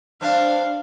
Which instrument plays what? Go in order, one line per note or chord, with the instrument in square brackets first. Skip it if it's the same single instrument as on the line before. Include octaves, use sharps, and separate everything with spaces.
[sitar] G2 C4 D4 [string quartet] F5